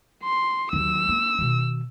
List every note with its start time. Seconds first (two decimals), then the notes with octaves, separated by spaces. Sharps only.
0.23 C6
0.73 D#2 F#3 E6
1.09 A#3
1.38 B2 D#3